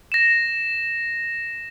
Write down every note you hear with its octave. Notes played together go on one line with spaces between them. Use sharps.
A#6 E7